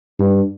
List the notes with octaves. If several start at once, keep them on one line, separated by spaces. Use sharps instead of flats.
G2